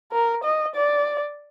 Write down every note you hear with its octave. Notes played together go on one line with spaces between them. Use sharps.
A#4
D#5
D5